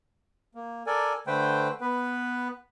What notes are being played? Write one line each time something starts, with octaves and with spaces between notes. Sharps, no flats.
A#3
A4 A#4 D5 G#5
D3 A3 B4 C5 G5
B3 B4